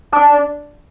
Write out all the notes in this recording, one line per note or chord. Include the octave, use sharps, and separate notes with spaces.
D4